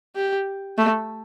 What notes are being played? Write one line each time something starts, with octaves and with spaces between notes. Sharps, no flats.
G4
A3